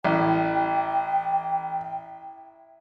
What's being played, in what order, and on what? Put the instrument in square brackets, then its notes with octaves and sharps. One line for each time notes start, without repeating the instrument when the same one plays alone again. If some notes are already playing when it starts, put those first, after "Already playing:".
[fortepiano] A1 [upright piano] E4 [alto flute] G5